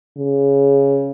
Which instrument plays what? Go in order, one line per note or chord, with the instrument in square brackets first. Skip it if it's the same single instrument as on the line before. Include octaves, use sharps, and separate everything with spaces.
[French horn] C#3